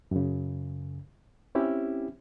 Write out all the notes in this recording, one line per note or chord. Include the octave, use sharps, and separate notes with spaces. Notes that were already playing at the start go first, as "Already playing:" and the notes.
F#2 C#3
C4 C#4 E4 G4